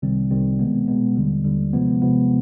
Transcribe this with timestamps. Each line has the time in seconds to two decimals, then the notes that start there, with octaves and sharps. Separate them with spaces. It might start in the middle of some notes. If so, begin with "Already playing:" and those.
0.02 C2 C3 D#3 G3 C4
0.31 C2 C3 D#3 G3 C4
0.59 B2 G#3 B3
0.88 B2 G#3 B3
1.16 D#2 D3 G3
1.44 D#2 D3 G3
1.73 C3 F3 G#3 B3
2.02 C3 F3 G#3 B3